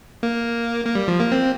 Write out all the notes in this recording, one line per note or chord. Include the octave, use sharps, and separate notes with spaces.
A#3
A#3
G3
F3
A#3
C4